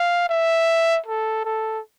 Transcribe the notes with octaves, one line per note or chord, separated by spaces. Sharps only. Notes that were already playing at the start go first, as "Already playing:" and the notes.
Already playing: F5
E5
A4
A4